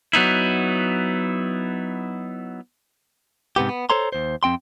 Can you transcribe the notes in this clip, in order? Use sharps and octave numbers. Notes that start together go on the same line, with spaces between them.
F#3 B3 D#4 E4
G#2 C3 B3 G4
B3
A4 C5 C#5 A#5 C6
D#2 C5
F2 C4 G5 C6